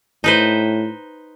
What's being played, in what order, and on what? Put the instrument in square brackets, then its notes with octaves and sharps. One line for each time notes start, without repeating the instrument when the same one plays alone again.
[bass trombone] A2 [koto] D#4 B4 C5